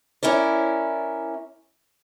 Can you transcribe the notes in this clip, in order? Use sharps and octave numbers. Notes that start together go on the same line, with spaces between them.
C#4 E4 A#4 D5